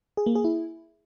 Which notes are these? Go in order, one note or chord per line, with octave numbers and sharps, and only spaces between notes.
G#4
A#3
G#4
E4